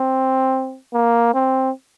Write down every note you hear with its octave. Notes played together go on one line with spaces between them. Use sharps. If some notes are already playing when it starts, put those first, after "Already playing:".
Already playing: C4
A#3
C4